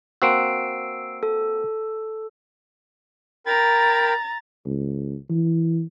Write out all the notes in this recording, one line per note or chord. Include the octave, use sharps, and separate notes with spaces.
A#3 C4 F#4 E6 C7 D7
A4
A#4 G5 A#5 B5 A6
C#2
E3